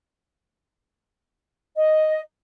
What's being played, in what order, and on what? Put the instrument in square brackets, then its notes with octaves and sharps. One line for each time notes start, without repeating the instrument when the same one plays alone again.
[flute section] D#5